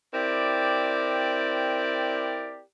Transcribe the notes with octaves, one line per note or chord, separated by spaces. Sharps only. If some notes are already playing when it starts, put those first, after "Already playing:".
C4 E4 G4 A#4 D5